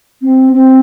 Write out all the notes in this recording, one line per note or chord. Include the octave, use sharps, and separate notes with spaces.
C4
C4